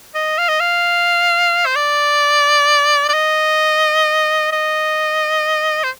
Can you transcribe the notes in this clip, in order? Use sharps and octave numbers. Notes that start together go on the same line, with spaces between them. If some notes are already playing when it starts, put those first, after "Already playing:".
D#5
F5
D#5
F5
C5
D5
D5
D#5
D#5
C5